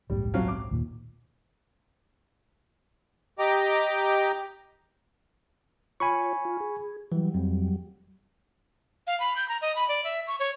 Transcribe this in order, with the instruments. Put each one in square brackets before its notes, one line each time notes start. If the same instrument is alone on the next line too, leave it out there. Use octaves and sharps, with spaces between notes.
[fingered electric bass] D1 A#1 G#2 [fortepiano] G3
[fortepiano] F3 F#3 F5
D6
[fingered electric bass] D#2 A#2
[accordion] G4 D#5 G5 A#5 D6
[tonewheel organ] F4 C#5 [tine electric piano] G#5 B5 C#6
[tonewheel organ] F4
G#4
[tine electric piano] E3 [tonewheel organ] F#3 G3
[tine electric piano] F2
[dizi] F5
B5
G6
A#5
D#5
B5
D5
E5
C#6
C#5